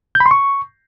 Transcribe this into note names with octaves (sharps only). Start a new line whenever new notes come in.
G6
B5
C6
C#6